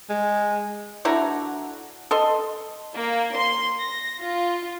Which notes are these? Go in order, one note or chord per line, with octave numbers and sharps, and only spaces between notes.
G#3
D3 E4 F#4 A#5
A4 D#5 C6
A#3
C6
A#6
F4